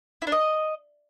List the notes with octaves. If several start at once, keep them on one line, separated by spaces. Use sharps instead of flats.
E4
D4
D#5